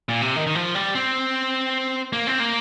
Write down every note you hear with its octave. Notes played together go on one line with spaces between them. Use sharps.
A#2
C3
D#3
D#3
F3
G3
C4
A#3
C4
A#3